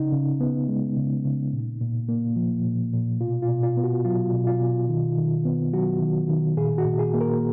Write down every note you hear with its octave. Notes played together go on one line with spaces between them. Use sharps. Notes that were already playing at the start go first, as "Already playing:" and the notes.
Already playing: C#3 D#4
C#3
B3
G#3
C#3
C#3
A#2
A#2
A#3
F3
A#2
A#2
B2 F4
F4
B2
F4
B3
F#4
F#3 F4
B2
F4
B2
D#3
D#3
B3
F#3 F#4
D#3
D#3
A#2 G#4
F#4
A#2
G#4
A#3
A#4